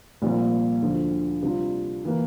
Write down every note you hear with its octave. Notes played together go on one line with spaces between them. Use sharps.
C2 A#2 F3 A#3
D2 D3 F3
C3 G3 D4 F4
E3 A#3